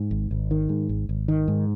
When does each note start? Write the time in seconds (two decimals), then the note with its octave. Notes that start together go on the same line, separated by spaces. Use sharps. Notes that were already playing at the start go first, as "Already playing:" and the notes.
Already playing: G#2
0.11 G#1
0.31 G#1
0.51 D#3
0.69 G#2
0.89 G#1
1.09 G#1
1.28 D#3
1.48 G#2